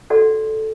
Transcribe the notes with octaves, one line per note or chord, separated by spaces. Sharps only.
F#4 A4 D5 F#5